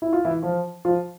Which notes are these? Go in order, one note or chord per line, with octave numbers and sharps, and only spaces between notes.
E4
F4
E3 E4
F3 F4
F3 F4